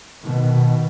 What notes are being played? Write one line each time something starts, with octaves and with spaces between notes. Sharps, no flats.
B2 D#3